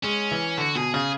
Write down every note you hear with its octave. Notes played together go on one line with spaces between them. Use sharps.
G#3 C#4
E3
D3 F#4
B2 G#4
C#3 G#4